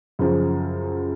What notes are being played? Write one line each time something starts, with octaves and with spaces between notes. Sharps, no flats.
F#2 C#3 F3